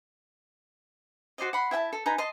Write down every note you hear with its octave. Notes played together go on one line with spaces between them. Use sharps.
F#4 C5 D5 D#5
F#5 B5 C6
E4 E5 G5 A5
A4
D#4 B4 G#5 A#5
D#5 A5 C6